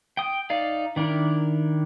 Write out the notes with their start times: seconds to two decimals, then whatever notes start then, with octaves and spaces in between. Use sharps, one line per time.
0.17 G5 D#6
0.50 D#4 D5 F5
0.96 D#3 D4 E4 A#4